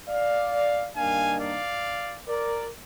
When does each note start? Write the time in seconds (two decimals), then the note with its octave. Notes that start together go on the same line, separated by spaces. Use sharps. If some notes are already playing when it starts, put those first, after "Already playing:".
0.08 D5 F5
0.95 G2 D#3 A#3 D4 F5 G#5
1.39 D5 F5
2.27 A#4 D5